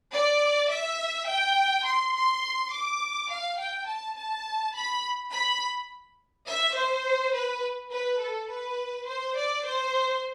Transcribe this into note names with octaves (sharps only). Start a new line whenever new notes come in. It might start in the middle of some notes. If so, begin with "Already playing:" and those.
D5
E5
G5
C6
C6
D6
F5
G5
A5
A5
B5
B5
E5
C5
B4
B4
A4
B4
C5
D5
C5